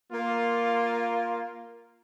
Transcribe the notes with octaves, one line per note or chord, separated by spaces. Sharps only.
A#3 F4